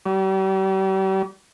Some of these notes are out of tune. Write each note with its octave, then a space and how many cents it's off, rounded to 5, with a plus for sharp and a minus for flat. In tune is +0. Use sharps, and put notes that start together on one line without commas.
G3 -40